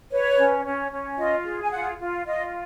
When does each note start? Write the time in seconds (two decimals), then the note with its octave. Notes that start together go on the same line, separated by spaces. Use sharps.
0.11 B4 C#5
0.37 C#4
0.65 C#4
0.92 C#4
1.18 F4 D#5
1.45 G#4
1.62 G#5
1.71 F4 F#5
1.99 F4
2.26 F4 D#5